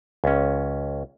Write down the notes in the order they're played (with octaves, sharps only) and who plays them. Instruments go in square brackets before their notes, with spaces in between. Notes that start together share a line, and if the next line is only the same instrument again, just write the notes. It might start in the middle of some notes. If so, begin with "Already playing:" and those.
[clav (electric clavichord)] C#2 C#4